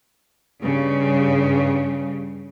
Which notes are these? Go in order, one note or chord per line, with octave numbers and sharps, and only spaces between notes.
G2 C#3